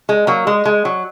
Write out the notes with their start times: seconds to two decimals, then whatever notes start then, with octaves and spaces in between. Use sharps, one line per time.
0.09 G#3
0.27 F#3 A#3
0.47 G#3
0.65 G#3
0.85 F#3